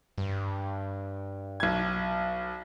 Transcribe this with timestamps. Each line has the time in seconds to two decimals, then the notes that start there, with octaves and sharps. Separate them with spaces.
0.18 G2
1.60 B1 G#6